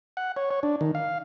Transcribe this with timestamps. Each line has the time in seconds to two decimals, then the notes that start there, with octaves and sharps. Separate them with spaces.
0.17 F#5
0.36 C#5
0.51 C#5
0.63 D4
0.81 D#3
0.95 F5